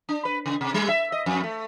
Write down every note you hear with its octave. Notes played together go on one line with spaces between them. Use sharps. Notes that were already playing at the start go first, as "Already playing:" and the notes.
D4
B4
C#3
C3
G3
E5
D#5
F2
A3